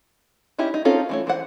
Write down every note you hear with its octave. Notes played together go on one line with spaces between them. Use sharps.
C#4 D#4 E4 G4
D#4
C4 C#4 D#4 F4 A4
E3 A3 C#5
E3 E4 C5 F#5